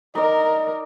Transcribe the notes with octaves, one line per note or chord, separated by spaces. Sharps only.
D#4 A#4 D5 D#5